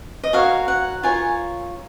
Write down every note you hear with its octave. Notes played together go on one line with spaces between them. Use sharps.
D#5
F#4 A#4 C#5 F5
F#5
F4 A#4 C#5 G#5